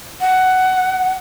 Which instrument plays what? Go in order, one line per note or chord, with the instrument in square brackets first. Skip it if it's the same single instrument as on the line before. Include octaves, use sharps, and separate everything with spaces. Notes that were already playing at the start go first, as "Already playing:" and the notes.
[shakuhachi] F#5